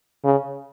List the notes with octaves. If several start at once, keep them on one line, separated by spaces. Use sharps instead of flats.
C#3